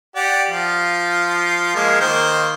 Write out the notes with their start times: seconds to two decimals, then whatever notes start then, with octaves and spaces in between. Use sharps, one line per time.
0.16 G4 D5 F#5
0.50 F3 F4
1.75 F3 G#3 A#3
2.00 D#3 A#3 C5